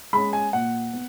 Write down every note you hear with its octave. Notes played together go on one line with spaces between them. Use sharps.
G#3 C#4 B5
G#5
A#2 F#5
B3